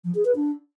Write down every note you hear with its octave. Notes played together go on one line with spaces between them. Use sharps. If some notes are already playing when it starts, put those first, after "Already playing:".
F3
G#4
B4
D4